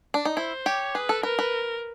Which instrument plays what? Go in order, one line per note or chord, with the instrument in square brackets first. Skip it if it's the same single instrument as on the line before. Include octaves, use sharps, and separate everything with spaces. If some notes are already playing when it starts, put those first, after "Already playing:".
[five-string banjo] D4
D#4
[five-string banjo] E4 [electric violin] C5
[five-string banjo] G4 [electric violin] C#5
[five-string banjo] G#4 [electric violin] B4
[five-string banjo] A4
[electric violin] A#4 [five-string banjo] B4
[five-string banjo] B4